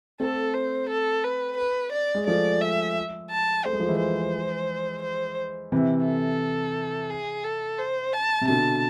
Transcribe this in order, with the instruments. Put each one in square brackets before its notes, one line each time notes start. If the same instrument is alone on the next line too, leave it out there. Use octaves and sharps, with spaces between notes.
[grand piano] A3 C4 [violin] A4
[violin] C5
A4
B4
B4
D5
[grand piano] G#3
[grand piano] F3 A3 [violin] D5
[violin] E5
A5
[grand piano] A3 [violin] C5
[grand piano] G#3
F3
E3 G#3
[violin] C5
C5
[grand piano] C3 E3
[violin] A4
G#4
A4
C5
A5
[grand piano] C3
[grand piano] B2 D3 [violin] A5